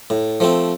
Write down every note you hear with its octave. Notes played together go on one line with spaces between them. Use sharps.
A2
F3 A3 C4